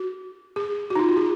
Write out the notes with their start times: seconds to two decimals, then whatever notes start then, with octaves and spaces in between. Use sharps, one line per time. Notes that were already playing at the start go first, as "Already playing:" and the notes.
Already playing: F#4
0.56 G#4
0.90 F#4
0.95 D#4
0.99 F4
1.09 F#4
1.17 G#4